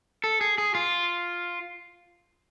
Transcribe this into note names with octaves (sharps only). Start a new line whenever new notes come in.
A4
G#4
G#4
F4